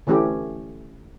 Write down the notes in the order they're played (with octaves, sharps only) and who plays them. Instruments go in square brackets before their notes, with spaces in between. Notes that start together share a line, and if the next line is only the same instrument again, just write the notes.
[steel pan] D3 E3 A3 C#4 G4